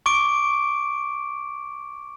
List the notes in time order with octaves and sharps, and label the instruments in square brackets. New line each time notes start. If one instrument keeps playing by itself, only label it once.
[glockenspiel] C#6 D6 D7